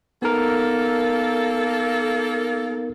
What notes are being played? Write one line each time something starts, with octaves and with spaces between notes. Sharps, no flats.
A#3 B3 D#4 A4 A#4